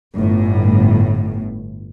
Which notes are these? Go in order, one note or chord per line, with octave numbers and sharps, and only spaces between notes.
G1 A2